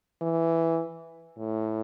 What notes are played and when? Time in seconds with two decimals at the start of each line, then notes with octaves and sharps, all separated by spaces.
0.22 E3
1.38 A2